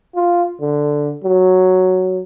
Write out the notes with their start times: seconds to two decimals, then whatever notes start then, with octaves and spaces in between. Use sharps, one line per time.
0.15 F4
0.61 D3
1.24 F#3